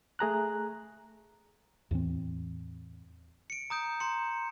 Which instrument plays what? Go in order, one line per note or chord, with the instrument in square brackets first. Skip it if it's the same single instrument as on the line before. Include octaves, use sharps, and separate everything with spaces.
[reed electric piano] A3 G#4 A#5 F#6
[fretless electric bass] E2 A2 E3 C4
[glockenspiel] C#7 D7
A#5 D#6 G6 D7
A#5 C6 C#7